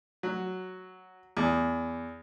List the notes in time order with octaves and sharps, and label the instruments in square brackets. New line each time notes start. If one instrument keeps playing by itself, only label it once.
[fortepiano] F#3
E2